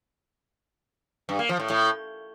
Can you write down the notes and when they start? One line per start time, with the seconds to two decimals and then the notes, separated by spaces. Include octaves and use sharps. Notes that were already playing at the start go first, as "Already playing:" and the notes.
1.29 G2
1.39 A#3
1.49 F3
1.60 A2
1.70 A2